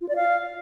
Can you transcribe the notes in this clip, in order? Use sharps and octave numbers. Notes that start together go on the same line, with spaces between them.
F4
D5
F5